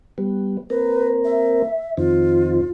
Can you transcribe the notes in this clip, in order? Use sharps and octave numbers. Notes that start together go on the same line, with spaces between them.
G3 B3
A#3 C4 A#4 B4
E5
F2 D#3 C4 F4